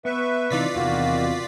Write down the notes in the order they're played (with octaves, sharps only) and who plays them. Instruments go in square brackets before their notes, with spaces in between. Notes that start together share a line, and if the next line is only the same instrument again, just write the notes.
[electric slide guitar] B3 [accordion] B4 E5 C#6
[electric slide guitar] C3 E3 D#4 [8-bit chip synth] F4 D5 B6
[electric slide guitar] E2 C3 [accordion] D#3 A#3 F#4